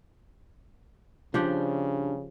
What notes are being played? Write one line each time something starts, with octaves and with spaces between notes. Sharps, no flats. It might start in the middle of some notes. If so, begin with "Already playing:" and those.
C#3 F3 G3 D4 G4 F#5